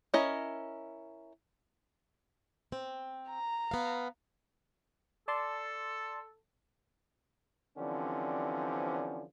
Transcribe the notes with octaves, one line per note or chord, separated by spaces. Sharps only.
C#4 E4 A#4 D#5
C4
A#5
B3 F5
A4 D5 A5 C6
D3 E3 F3 G3 C4 C#4